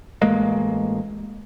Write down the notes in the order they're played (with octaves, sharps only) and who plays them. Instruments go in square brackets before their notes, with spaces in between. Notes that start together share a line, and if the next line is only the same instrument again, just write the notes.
[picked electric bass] A1 G#3 A#3